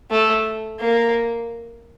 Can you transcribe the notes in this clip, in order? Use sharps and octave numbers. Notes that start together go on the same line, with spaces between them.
A3
A#3